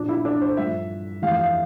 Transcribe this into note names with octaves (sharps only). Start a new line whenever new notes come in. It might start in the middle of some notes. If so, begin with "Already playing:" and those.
Already playing: A#2 F3 D4
E4
D4
C5
G2 F3 E5
F2 E3 G3 F5
F5
E5